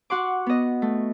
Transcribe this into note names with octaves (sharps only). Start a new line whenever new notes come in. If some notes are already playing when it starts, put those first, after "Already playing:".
F#4 F#5 C6 D6
B3 D#5
A3